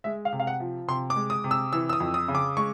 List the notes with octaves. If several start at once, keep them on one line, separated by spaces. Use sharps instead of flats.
G#3 E5
F5
C3
F5
F#5
F3
C3 C6
D6
G#3
D#6
C3
E6
E3 E6
E6
D#6
F2
D#6
C#3
D6
G#3 C#6